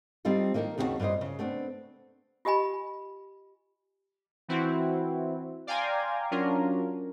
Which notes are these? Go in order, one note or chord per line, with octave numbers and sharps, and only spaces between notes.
G3 C4 D#4 F4 A4
D#3 A#3 D#4 A4 A#4
D#2 C#3 C4 E4 F#4 A5
G2 A#2 B4 C5 D#5
C#3
A3 B3 C4 D4
F4 G4 D#5 G#5 B5
E3 C4 E4 F#4
D5 F5 G5 G#5 A#5 C6
F#3 C#4 D4 F4 A#4